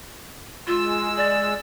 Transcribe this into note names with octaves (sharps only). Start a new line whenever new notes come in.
G#3 F4 E6
D5